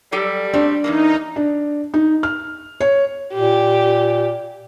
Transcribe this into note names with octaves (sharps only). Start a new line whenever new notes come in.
F#3 G3 G4 A4
A3 C4 D4 G4
E2 E3 A#3 D#4
D4
D#4
F6
C#5
A#2 G4